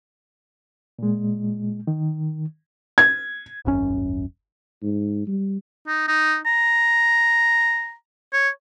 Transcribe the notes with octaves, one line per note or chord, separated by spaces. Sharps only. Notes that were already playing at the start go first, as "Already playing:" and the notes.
A#2 G#3
D#3
G#6
D#1 G#1 F#2 C#4
G#2
G3
D#4
D#4
A#5
C#5